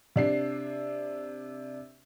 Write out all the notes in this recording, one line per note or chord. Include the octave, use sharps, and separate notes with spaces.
C3 D4 C7